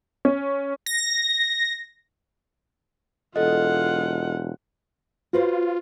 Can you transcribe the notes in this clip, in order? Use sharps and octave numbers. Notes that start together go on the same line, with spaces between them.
C#4
A#6
E1 F4 A4 D#5 F#5
F4 F#4 B4 C5